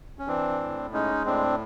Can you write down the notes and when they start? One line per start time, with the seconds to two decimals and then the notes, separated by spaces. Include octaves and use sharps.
0.19 C#4
0.28 E3 C4 D4
0.60 A2
0.93 G#3 C#4 D#4
1.26 A2 C4 D4